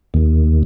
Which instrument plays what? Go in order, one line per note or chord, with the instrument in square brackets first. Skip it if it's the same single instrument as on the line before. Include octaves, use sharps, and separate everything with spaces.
[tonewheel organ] D#2